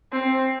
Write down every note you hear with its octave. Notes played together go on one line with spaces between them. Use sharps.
C4